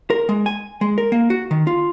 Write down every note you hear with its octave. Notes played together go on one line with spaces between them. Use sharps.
A#4
G#3
G#5
G#3
A#4
A#3
F#4
D#3
F4